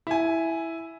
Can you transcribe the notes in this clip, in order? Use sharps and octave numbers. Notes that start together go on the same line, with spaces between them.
E4 G#5